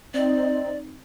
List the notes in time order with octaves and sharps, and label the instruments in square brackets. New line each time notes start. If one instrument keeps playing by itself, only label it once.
[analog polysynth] C4 D#4 [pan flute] D5